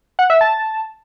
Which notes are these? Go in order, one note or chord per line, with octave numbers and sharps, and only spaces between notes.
F#5
E5
A5